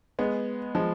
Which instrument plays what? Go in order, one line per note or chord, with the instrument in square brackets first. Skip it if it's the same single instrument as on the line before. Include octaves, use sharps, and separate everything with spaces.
[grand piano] G#3 B3
F3 G#3